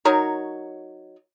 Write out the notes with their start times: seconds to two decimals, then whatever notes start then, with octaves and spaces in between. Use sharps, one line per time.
0.05 F#3 D#4 A#4 C#5